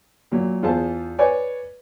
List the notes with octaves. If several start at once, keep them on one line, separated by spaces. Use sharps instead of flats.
A#2 F#3
E2 F4 G#4 C5 A5
B4 C#5 D5 G#5